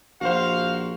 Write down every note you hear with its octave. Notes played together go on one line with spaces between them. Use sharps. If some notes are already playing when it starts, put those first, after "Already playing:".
A#1 F#4 C5 F5